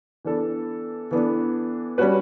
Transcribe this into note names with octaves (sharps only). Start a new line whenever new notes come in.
E3 B3 D4 A4
E3 B3 D4 A4
G3 C#4 F#4 B4